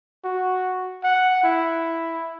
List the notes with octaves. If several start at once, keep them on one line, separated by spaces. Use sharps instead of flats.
F#4
F#5
E4